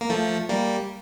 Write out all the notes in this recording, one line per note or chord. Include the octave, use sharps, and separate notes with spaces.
A#3
F3 A3
G3 A#3